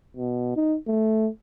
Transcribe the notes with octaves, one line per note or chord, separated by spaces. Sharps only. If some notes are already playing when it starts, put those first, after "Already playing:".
B2
D#4
A3